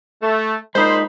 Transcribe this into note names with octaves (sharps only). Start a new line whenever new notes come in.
A3
A#2 G#3 D#4 C5 B5